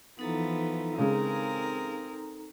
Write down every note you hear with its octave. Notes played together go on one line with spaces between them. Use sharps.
E3 F3 B3 D#4 A4 A#5
C#3 G#3 C4 G#4 A#4